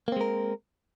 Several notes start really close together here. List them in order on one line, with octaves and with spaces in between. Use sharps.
A#3 C4 G#3 A#4